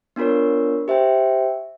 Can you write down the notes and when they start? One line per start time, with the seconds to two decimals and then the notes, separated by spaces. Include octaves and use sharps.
0.16 B3 D4 F4 A#4 C#5
0.88 G4 C5 E5 G5